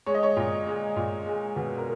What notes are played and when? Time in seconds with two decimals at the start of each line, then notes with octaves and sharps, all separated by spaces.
0.06 G#3 C#5
0.15 D#5
0.23 C#5
0.37 A#2
0.67 G#3
0.96 A#2
1.27 G#3
1.56 B2
1.78 A#4